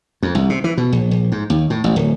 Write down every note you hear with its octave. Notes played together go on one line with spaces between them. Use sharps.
F2
C2
C3
E3
B2
A#1
A#1
G#2
D#2
A2
A1
D1